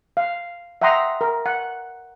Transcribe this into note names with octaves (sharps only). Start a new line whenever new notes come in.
F5
E5 F#5 G5 A#5 C6 D#6
A#4
F#5